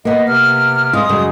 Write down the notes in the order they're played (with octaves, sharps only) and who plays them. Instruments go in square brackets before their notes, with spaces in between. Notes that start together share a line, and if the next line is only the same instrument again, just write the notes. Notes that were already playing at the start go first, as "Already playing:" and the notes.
[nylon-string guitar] A#3 B3 [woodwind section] B4 D#5
[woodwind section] C3 F6
[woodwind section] G3 C6 D#6 [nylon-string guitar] G#3 F4
[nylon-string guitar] F#2 C#3 G#3